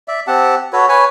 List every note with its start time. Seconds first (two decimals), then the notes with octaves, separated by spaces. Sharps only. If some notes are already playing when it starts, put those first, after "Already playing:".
0.08 D5 E5
0.27 C4 G4 F#5 A5
0.73 F#4 A4 B4 C#5
0.89 B4 C#5 G#5